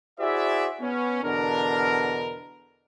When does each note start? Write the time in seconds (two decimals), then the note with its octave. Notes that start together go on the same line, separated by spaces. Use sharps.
0.20 E4 F#4 G#4 C5 D5 E5
0.81 B3 C#4
1.24 E2 B2 D3 D4 A#4